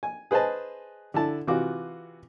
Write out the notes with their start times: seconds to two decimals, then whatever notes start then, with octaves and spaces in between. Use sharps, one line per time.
0.03 G#5
0.31 G#4 B4 C5 D#5 A5
1.14 D3 E4 A5
1.47 C3 E3 F4 F#4 D6